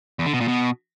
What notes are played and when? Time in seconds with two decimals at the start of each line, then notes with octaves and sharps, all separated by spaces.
0.19 E2
0.26 D3
0.33 B2
0.41 A#2
0.48 B2